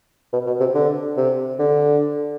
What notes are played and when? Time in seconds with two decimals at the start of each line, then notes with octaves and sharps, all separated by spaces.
0.33 B2
0.47 B2
0.60 C3
0.75 D3
1.17 C3
1.59 D3